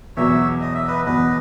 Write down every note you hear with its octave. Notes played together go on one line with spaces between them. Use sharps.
E2 B2 F#3 C#5 E5
D#5
E5
B4 D#5
E2 B2 F#3 B4 D#5